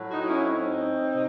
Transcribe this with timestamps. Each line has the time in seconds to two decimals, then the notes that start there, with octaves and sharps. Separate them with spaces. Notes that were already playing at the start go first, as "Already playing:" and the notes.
Already playing: A2 F#3
0.10 D#4 F#4
0.20 D#4
0.26 C#4 E4
0.43 C4 D#4
1.13 C3